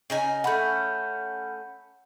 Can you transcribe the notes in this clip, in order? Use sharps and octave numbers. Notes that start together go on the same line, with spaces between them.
C#3 D#4 G#5
A3 C#4 F#5 B5 G6